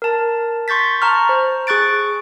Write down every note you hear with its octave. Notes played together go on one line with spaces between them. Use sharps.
A#4 A5
C6 C#6 G6 A6 B6
A5 A#5 C#6 F6
C5
G#4 C#6 F#6 A6 D7